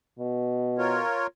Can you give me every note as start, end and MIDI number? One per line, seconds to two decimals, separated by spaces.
0.19 1.00 47
0.78 1.27 65
0.78 1.27 70
0.78 1.27 73